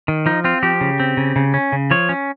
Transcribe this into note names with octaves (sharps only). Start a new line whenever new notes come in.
D#3
F3 D#4
C4 F4
F3 G4
C#3
C4
C#3
C#3
C#4
C#3
F3 C#5
C#4